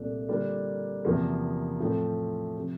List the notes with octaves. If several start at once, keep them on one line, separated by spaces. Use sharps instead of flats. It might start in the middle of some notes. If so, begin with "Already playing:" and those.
Already playing: C2 A#2 A3 D4 A4
D3 G3 A#3 D4 F4
E2 C3 F3 A#3
A2 F3 A3 C4
C3 F3